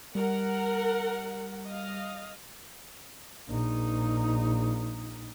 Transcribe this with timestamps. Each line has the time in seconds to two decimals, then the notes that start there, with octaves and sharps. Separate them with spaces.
0.15 G3 A#4 F#5
1.65 D#5 F5
3.48 A#1 D#4